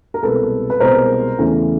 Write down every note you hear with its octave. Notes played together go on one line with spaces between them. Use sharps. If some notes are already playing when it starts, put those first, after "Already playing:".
A#4
C2 B2 G#3 A4 B4
B4
C2 B2 G#3 A#4 C5
E2 C#3 E3 A3